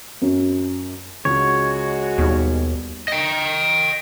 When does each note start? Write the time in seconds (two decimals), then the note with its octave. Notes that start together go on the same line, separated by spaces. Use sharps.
0.22 F#2
1.25 C#2 G#3 F#4 C#5
2.18 D#2 B2 D#3 G3
3.08 D#5 G5